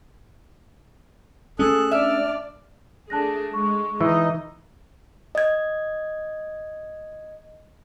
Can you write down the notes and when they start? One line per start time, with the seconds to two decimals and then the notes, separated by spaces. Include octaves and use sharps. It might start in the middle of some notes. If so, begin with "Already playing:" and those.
1.59 A3 C#4 G#4 A4 F#6
1.91 D4 D5 E5 F6
3.10 A3 D4 G#4 A5 F#6 A#6
3.54 G#3 C#6
4.01 E3 D#4 D#5
5.35 D#5 G#6